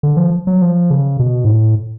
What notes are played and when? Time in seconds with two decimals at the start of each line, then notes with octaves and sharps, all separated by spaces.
0.03 D3
0.17 F3
0.47 F#3
0.62 F3
0.91 C#3
1.19 B2
1.44 G#2
1.49 A2